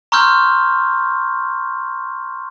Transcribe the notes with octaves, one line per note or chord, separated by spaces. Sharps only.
A#5 C6 C#6 E6 F6 G6